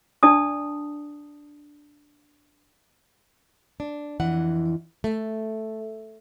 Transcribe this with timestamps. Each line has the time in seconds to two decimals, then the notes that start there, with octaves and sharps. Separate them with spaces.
0.23 D4 D5 A5 D#6
3.80 D4
4.20 F2 E3 F#5
5.04 A3